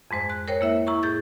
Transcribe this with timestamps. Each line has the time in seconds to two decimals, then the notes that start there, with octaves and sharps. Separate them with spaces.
0.11 F2 G#2 G#3 C5
0.30 F#6
0.48 A#4 C5 C#5 G5
0.61 A#3 E4 E5
0.87 E4 A#5 C#6
1.03 A2 G#4 G6 A6